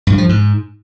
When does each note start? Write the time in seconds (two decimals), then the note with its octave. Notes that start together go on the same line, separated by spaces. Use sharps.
0.07 G2
0.18 F3
0.29 G#2